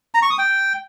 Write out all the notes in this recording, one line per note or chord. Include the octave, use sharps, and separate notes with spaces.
A#5
C#6
D#6
G5